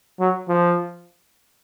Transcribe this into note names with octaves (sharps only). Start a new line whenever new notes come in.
F#3
F3